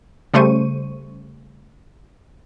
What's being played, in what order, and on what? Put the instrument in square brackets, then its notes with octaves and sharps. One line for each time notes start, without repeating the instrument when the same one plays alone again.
[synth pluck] C#3 G3 A3 C5 C#6 D#7